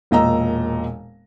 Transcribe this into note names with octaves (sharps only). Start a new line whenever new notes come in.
E1 A#2 D#5 A#5 E6